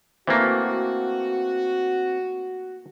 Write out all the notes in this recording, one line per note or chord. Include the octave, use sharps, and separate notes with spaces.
E3 A3 A#3 C4 F#4